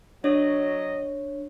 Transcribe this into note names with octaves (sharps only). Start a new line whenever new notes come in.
F#3 D4 C#5 D#5